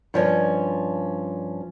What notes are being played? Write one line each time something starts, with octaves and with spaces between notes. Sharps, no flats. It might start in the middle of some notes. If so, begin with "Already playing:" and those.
G2 F3 C#4